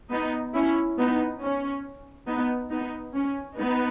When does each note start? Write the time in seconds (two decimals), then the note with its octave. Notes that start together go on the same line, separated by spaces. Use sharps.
0.11 B3 D#4
0.54 C#4 E4
0.98 B3 D#4
1.41 C#4
2.27 B3 D#4
2.70 B3 D#4
3.14 C#4
3.57 B3 D#4